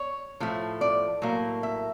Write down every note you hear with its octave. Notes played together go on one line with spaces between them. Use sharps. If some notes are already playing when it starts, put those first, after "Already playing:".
Already playing: C#5
A2 F3 A3
D5
A2 F#3 A#3
E5